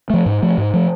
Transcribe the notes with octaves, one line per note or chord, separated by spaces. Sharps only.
F3 A3
G#2
F3 A3
G#2
F3 A3